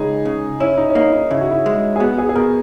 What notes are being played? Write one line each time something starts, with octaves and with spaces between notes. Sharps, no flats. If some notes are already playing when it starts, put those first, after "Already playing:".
Already playing: C#2 D#4 G#4
C#3
C#4 E4
D#4
C#4
A#3 D#4
D#4
C#3 E4
F#4
E4
G#3
G#4
B3 F#4
G#4
G#4
B2 A#4